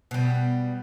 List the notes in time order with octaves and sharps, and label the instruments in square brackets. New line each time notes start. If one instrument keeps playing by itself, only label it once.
[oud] B2 G3